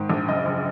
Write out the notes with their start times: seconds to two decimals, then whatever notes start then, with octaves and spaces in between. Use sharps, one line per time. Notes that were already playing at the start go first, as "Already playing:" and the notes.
Already playing: G#2 D#3
0.10 A#1
0.28 F#1 D#5
0.45 F#1